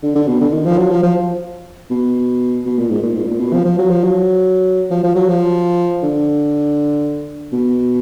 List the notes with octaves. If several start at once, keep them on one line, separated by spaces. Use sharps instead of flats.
D3
D3
B2
D3
D#3
F3
F#3
F3
F3
B2
B2
A#2
G#2
A#2
G#2
B2
A#2
B2
F3
F3
F#3
F3
F#3
F3
F3
F#3
F3
D3
B2